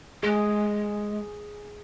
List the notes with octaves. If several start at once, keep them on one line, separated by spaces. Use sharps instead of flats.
G#3 G#4